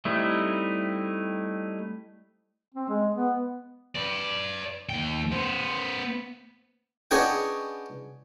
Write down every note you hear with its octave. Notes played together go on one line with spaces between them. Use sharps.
G3 A3 C4 D#4 E4
C4
G#3
B3
B4 D5
D#2 G5
B3 C5
B3 C#4 D4 G#4 D#5 G5